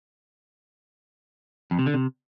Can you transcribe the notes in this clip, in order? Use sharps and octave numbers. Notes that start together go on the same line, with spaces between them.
F2
C3
D3
C3